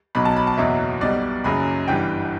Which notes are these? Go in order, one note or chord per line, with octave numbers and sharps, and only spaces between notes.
B1 B2 F#3 B5
A5
B5
A5
F#1 E2 B2 F#3 E5
B1 B2 G3 D5
F#1 F#2 C#3 F#3 B5
G1 G2 E3 G3 G5